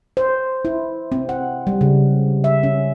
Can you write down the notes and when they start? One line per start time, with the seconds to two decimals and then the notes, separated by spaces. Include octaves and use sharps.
0.17 C5
0.65 E4
1.12 C4
1.29 F#5
1.67 G3
1.81 C#3
2.44 E5
2.63 C#4